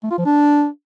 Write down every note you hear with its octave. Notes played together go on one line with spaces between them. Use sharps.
A3
F4
F3
D4